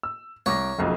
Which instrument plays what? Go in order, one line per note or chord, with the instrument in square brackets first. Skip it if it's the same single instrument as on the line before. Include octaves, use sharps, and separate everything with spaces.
[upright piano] E6
[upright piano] C2 D6 A#6 [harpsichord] C#5
[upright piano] F#1 B1 F2